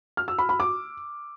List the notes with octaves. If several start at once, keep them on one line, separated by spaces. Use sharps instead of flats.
F6
E6
B5
B5
D6